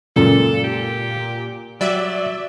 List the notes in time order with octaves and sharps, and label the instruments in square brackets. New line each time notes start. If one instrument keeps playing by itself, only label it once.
[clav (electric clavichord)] C#2 F#2 [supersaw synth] A#2 [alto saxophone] A4
[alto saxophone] G4
[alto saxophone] F#3 [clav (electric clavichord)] G3 [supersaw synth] D5 E5